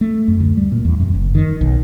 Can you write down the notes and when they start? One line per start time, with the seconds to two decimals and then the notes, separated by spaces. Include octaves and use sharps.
0.01 A3
0.28 F#2
0.40 D2
0.57 G3
0.72 A#2
0.85 E2
1.00 F#2
1.15 F#1
1.35 D#3
1.61 B1